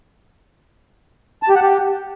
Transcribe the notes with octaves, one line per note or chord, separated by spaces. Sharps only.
A5
G4
F#5
G4